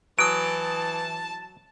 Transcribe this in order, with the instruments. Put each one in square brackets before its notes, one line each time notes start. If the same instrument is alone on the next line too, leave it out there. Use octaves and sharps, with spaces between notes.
[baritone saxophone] E3 [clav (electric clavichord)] F#3 [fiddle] A5 [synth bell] D#6 D7